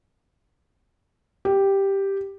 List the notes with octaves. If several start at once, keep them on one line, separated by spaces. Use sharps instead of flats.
G4